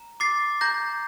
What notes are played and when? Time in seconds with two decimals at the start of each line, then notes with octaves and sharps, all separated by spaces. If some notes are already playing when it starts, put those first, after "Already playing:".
Already playing: A#5
0.20 D6 A6 C7
0.61 A#5 G6 A#6